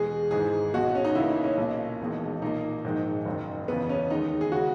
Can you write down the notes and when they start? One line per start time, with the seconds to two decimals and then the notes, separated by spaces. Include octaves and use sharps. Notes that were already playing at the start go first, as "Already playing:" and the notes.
Already playing: E2 B2 G#3 G#4
0.31 G#1 G#2 E3 G#3 G#4
0.74 B1 B2 G#3 F#4
0.95 C#4
1.05 D#4
1.15 C#2 C#3 E3 A#3 E4
1.30 D#4
1.44 C#4
1.57 B1 A#2 A#3
2.00 E1 E2 D#3 G#3
2.41 B1 A#2 A#3 D#4
2.84 A#1 G#2 D#3 G#3
3.25 F#1 F#2 D#3
3.68 E1 E2 C#3 B3
3.89 C#4
4.10 D#2 D#3 G#3 D#4
4.41 G#4
4.52 C#3 G#3 F#4